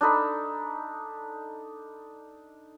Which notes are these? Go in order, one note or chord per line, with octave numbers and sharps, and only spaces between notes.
D4 D#4 A4 B5